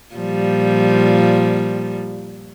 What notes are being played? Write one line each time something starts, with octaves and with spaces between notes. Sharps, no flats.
A#2 F3 G3